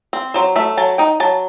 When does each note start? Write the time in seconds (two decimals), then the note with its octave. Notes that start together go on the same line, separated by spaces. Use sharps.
0.13 C4
0.34 F#3 C5
0.56 A3 E5
0.77 F#3 A5
0.98 D#4 G5
1.20 F#3 A5